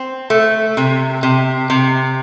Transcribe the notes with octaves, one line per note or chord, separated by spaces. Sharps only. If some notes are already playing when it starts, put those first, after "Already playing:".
Already playing: C4
A3
C3
C3
C3